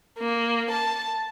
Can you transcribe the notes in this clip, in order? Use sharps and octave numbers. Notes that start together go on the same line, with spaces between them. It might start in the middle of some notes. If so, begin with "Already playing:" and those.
A#3
A5